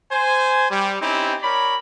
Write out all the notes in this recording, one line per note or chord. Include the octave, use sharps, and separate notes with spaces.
C5 G#5
G3
C4 C#4 D#4 E4 G4
A#4 C#5 D5 B5